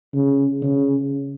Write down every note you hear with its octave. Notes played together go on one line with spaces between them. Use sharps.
C#3
C#3